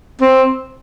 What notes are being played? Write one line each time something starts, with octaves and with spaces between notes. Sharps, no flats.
C4